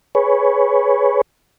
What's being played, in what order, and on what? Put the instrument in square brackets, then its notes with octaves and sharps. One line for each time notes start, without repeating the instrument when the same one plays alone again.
[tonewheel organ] G#4 B4 C#5